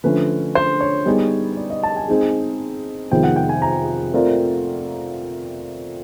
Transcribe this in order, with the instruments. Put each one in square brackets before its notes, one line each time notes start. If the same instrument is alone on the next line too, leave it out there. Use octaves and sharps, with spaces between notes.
[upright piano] D3 F3 A3 C#4 [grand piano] B4
[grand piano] C5
C#5
[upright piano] G3 B3 D#4 G#4
[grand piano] D5
D#5
A5
G#5
[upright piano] G#3 C4 D#4 G#4
[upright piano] F2 C3 D#3 G#3 B3 [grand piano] G5
[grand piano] F#5
G5
G#5
A#5
[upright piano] A3 C4 F4 A#4 D5